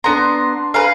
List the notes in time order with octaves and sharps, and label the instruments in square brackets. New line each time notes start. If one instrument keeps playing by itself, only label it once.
[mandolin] B3 A#5 [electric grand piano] D4 C6
[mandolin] B4 F5 [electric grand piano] G#5 A#5